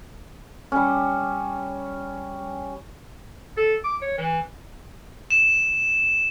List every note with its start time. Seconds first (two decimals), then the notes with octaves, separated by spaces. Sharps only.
0.72 G3 C#4
3.57 A4
3.84 D6
4.02 C#5
4.17 E3
5.30 E7